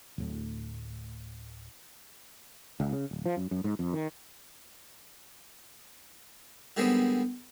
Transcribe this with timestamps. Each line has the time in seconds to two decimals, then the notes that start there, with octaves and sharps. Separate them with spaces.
0.18 D1 A2
2.80 C#2
2.93 C#3
3.11 D1
3.26 F3
3.37 F#2
3.51 F#2
3.64 G#2
3.79 F2
3.93 D#3
6.77 D3 D#3 G3 G#3 B3 C4